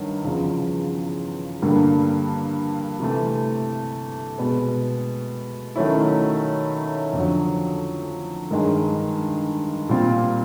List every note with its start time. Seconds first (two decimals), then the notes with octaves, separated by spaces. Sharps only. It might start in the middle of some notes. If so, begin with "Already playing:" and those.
Already playing: G2 D#3 F#3
0.24 E2 C#3 F3
1.62 G2 D3 G3 A#3
3.00 C3 E3 A3
4.38 B2 G#3 B3
5.76 D#3 F#3 A3 C#4 E4
7.13 F2 D3 F#3
8.51 G2 D#3 G#3
9.89 A#2 G3 C4 F4